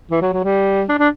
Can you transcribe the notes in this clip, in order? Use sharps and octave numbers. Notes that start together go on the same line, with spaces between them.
E3
F#3
F#3
G3
D4
D4